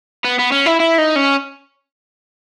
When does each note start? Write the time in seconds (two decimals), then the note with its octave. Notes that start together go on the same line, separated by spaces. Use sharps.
0.25 B3
0.39 B3
0.52 C#4
0.66 E4
0.80 E4
0.98 D#4
1.16 C#4